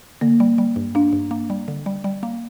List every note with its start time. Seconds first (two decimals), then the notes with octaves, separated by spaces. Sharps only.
0.21 D3 A#3
0.40 G3
0.58 G3
0.76 G2
0.95 A#3 D4
1.13 G2
1.31 A#3
1.50 G3
1.68 D3
1.86 G3
2.04 G3
2.23 A#3